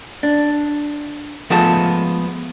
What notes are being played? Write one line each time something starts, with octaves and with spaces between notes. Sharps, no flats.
D4
F3 G#3 A3 B3 A5